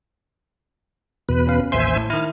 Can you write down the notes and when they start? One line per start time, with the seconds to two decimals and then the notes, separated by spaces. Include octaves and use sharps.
1.29 E2 B2 B4
1.47 C#4 F5
1.72 A1 D#2 C5 E5 G#5 C6
1.96 A2
2.10 D#3 E4 F6